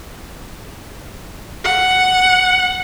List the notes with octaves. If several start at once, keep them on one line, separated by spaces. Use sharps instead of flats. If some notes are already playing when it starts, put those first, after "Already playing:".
F#5